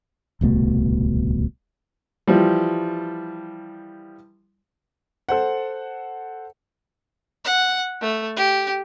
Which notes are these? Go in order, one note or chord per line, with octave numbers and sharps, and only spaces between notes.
D1 C2 B2 A3
E3 F3 G3
A4 C5 F#5
F#5
A3
G4